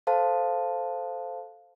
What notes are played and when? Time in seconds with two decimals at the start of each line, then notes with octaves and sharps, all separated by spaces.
0.07 A4 C5 F5 A5